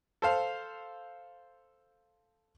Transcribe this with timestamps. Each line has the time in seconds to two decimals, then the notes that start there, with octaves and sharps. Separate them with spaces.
0.22 A4 C5 F5